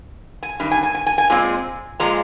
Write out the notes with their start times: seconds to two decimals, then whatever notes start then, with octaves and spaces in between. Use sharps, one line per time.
0.43 G#5
0.60 G2 D#3
0.71 G#5
0.83 G#5
0.95 G#5
1.06 G#5
1.18 G#5
1.30 A#2 G#3 C4
2.00 A#2 F3 G#3 A#5